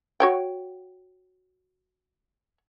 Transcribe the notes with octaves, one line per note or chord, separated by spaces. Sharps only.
F#4 C#5 G5